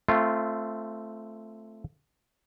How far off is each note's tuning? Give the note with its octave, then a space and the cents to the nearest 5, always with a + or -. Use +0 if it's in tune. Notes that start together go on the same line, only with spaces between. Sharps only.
A3 +0 C4 +0 F4 -20